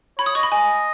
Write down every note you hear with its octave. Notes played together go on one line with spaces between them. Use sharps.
C#5 B5
D#6
D#5 C#6
B5
D#5 G#5